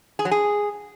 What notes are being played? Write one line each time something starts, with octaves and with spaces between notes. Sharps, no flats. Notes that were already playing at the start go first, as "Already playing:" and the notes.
G#4
F#3
G#4